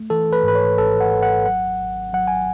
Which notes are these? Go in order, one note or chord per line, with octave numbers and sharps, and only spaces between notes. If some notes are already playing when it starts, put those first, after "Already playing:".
Already playing: A3
E3 A4
B4
G#2 B4
C#5
G#1 A4
F#5
G#1
F#5
F#3 F#5
G#1
F#3 F#5
G#5